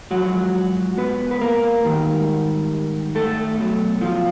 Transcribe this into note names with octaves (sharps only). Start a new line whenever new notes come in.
G#2 F3 F#3 F#4
B3 B4
B4
A#3 A#4
G#2 D#3 G3
A3 A4
B2 F#3
F3 F4